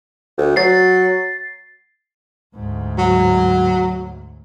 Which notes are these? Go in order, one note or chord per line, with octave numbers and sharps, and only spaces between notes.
D2
F#3 A6 C7
D2 G#2
F#3